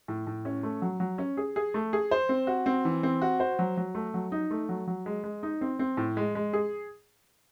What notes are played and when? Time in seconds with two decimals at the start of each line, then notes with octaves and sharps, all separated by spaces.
0.08 A2
0.27 A2
0.45 C#4
0.63 A3
0.82 F#3
1.00 F#3
1.18 C#4
1.37 G#4
1.56 G#4
1.74 A3
1.93 G#4
2.11 C5
2.29 C4
2.47 F#4
2.66 C4
2.85 E3
3.03 C4
3.22 F#4
3.40 C5
3.59 F#3
3.77 F#3
3.95 A3
4.14 F#3
4.32 D#4
4.51 A3
4.69 F#3
4.87 F#3
5.06 G#3
5.24 G#3
5.43 D#4
5.61 C4
5.79 C4
5.97 A2
6.17 G#3
6.35 G#3
6.53 G#4